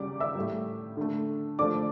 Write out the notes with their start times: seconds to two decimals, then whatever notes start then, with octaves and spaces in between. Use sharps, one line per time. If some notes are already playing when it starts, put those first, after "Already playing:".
Already playing: C#3 G3 D5 D6
0.20 E5 E6
0.35 A2 G3
0.97 D3 A3
1.59 D3 F3 A3 D5 D6